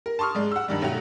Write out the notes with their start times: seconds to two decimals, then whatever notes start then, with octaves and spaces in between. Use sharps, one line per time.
0.06 A#4
0.19 A5 C6 C#6 D#6 F6
0.35 G#2 G#3 D5
0.52 F#5 E6
0.68 G2 D#3 G3
0.82 B1 F#3 A3 F#4 F7